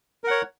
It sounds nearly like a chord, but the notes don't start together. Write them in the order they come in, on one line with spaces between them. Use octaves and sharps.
A#4 F#5 C#5